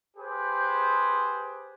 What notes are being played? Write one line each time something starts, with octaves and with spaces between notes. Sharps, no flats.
G4 G#4 B4 C5